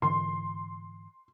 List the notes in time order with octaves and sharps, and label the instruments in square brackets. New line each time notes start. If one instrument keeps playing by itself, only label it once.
[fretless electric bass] G#2 D3 E3 [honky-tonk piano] C6